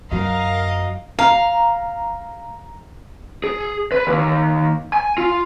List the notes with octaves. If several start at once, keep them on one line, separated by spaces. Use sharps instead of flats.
F#2 F#3 A#4 D#5 F5
F5 A#5
G#4
B4
D#2
G#5
F4